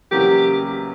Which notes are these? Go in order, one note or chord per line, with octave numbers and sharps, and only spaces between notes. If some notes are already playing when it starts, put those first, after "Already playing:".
E2 C#3 F#3 A#3 G4